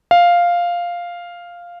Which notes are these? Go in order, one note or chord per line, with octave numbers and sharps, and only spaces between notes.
F5